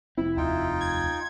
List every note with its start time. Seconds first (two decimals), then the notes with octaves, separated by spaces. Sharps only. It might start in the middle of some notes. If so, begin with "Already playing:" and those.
0.17 F1 C4 E4
0.37 D#2 D#4 F4 G5
0.81 G#6